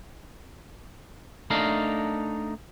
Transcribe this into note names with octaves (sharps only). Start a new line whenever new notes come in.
A3 D4 D#4 A#4 F5